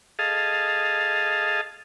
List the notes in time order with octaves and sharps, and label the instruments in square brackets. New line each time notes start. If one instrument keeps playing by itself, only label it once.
[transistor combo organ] G#4 A4 D#5 F5 A5